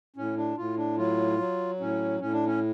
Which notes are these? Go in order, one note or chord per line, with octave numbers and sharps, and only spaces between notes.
A2 C#4
D4
A2 F4
D4
F#3 F4
F#3
A2 C#4
A2 C#4
D4
C#4